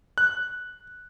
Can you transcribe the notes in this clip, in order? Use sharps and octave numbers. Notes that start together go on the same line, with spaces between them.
F#6